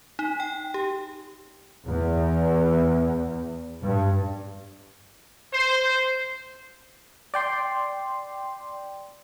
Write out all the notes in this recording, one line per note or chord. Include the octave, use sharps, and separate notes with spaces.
D#4
G5
G4
E2
G2
C5
D5 G5 C6